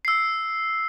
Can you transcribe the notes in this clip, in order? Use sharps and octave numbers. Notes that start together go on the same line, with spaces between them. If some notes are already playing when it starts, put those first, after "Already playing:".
E6 C7